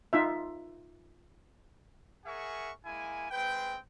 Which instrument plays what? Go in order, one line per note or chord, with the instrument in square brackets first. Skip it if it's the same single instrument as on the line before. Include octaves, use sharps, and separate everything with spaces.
[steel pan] D#4 F4 E5
[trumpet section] G#4 A#4 E5 F#5 G#5 C#6
G#3 A#3 E4 G#5
G#3 C4 B4 G5